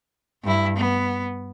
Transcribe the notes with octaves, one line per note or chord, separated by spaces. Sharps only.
G2 E4
B3